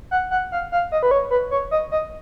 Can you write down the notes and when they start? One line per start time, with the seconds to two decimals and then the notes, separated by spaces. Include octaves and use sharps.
0.11 F#5
0.31 F#5
0.52 F5
0.72 F5
0.92 D#5
1.03 B4
1.11 C#5
1.31 B4
1.51 C#5
1.71 D#5
1.91 D#5